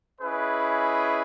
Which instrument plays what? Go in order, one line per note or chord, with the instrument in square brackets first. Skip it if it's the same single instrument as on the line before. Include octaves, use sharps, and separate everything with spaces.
[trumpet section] C#4 E4 G#4 B4 D#5